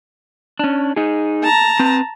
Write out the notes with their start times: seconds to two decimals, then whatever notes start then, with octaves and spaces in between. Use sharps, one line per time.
0.59 C#4 D4
0.96 D#4 G#4
1.43 A5 A#5
1.79 C4 B4